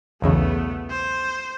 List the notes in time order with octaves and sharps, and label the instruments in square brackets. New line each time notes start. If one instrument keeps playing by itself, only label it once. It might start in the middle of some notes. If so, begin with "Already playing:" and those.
[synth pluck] B1 E2 C#3 [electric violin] A3 B3
[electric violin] C5